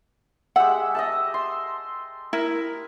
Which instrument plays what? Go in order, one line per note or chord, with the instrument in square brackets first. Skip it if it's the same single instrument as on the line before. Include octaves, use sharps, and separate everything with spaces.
[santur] G#3 G4 E5 [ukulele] F#5
[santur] D#5 E5 A5
C6
[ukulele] E4 [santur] A#4